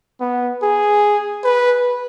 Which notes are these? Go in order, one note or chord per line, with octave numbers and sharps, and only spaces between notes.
B3
G#4
B4